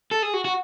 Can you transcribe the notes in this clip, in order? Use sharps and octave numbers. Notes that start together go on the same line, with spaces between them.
A4
G#4
F#4
F#4